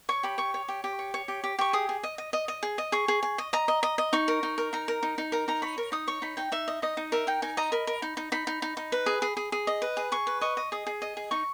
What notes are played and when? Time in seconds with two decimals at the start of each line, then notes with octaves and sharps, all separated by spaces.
0.09 C#5 C#6
0.23 G4 B5
0.38 C#5 C#6
0.54 C#5
0.68 G4
0.84 G4
0.99 C#5
1.14 C#5
1.28 G4
1.44 G4
1.59 G4 C#6
1.73 G#4 D#6
1.89 G#4
2.03 D#5
2.18 D#5
2.33 D#5
2.48 D#5
2.63 G#4
2.78 D#5
2.92 G#4 C#6
3.08 G#4
3.23 G#4
3.38 D#5
3.53 D#5 A#5
3.68 D#5
3.83 D#5
3.98 D#5
4.13 D#4 C#6
4.28 A#4
4.43 D#4
4.58 A#4
4.73 D#4 A#5
4.88 A#4
5.03 D#4
5.18 D#4
5.32 A#4 A#5
5.48 D#4 A#5
5.62 C#5 B5
5.78 A#4
5.92 D#4 D#6
6.07 C#5 C#6
6.22 D#4 B5
6.37 D#4 G5
6.52 D#4 E5
6.68 D#5
6.82 D#4 D#5
6.97 D#4
7.12 A#4 E5
7.27 D#4 G5
7.42 D#4 G#5
7.57 D#5 A#5
7.72 A#4 B5
7.87 A#4
8.02 D#4
8.17 D#4
8.32 D#4 B5
8.47 D#4
8.62 D#4
8.77 D#4
8.92 B4
9.06 G#4
9.22 G#4
9.37 G#4
9.52 G#4
9.67 D#5
9.82 B4
9.97 G#4
10.12 G#4 C#6
10.27 B4
10.41 D#5 C#6
10.57 D#5
10.72 G#4 D#6
10.87 G#4
11.02 D#5
11.17 G#4
11.31 D#4 C#6